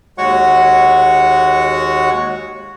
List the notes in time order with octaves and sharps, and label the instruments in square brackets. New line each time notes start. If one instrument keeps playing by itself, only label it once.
[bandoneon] D#2 G#3 F#4 C#5 F#5 C#6